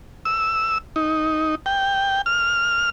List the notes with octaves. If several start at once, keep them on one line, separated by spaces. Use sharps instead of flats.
E6
D#4
G5
F6